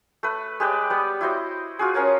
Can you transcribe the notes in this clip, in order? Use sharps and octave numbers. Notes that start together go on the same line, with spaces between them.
A3 B4
G#3 G4 B4 D5
G3 B3
E4 F#4 C5 D#5
F4 F#4 G#4
C#4 A#4 C#5 A5